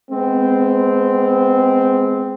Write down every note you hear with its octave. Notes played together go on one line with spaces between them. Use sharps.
G#3 B3 C4